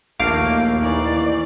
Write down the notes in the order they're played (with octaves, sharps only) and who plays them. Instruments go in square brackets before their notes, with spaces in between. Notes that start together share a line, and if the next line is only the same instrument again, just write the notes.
[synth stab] A#1 F5 D6 [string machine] D#2 [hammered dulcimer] A3 [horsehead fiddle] A#3
[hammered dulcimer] E3 D#4 [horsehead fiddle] D5